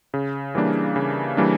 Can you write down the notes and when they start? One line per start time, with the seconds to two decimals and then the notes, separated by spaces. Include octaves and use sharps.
0.14 C#3
0.55 E3 G3 A#3 D4
0.96 C#3
1.37 E3 G3 A#3 D4